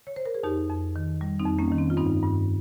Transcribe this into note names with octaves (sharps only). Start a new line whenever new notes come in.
C#5
C5
A#4
G#4
F2 D#4 G4
F2
D#3
G3
C4 D#4
F2
A#3 C#4
D#3
C4
F4
G2 C4 D#4
G2